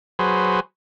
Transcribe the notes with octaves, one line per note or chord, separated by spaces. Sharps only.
F#3 G#4 B4 C5